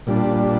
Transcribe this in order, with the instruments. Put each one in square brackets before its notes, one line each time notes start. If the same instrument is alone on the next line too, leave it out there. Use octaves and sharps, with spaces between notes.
[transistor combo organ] A#2 G3 D4